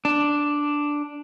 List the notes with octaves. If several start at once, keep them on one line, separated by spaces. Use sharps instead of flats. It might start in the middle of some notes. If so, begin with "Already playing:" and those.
D4